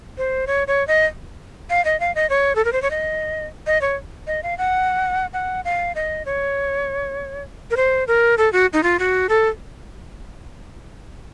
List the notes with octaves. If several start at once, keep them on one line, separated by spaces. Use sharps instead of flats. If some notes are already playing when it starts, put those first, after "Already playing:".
C5
C#5
C#5
D#5
F5
D#5
F5
D#5
C#5
A4
A#4
C5
C#5
D#5
D#5
C#5
D#5
F5
F#5
F#5
F5
D#5
C#5
A#4
C5
A#4
A4
F#4
D#4
F4
F#4
A4